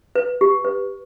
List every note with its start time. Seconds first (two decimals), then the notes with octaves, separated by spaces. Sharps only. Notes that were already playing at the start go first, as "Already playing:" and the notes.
0.15 B4
0.41 G4
0.64 B4